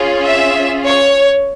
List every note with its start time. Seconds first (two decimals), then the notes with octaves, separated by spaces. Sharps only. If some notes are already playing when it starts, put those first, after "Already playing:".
Already playing: C#4 F4 G#4
0.24 E5
0.85 C#5